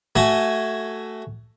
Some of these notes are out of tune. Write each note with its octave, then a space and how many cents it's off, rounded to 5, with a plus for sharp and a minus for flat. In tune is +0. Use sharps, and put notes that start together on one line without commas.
A3 +5 F#4 +20 G#5 +0